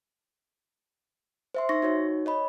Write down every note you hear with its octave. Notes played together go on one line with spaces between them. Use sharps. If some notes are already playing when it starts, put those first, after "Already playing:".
C5 E5 C6
D#4 C#6 A#6
D#4 F#4 C#5
C#5 D#5 B5